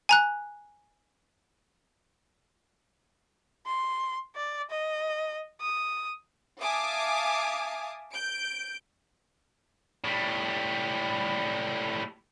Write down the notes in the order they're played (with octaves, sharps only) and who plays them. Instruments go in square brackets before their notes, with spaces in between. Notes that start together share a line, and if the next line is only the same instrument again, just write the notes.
[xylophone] G#5 A#5 F#6
[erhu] C6
D5
D#5
D#6
[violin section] E5 F5 G#5 A5 D6 D#6
G6 D7
[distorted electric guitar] A2 G3